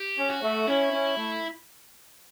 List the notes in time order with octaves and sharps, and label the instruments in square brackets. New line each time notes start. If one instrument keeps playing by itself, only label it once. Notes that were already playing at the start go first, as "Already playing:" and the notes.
Already playing: [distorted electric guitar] G4
[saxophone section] C#4
[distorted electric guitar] F#4
[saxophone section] A3
[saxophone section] C#4 [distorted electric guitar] E4
[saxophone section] C#4
A3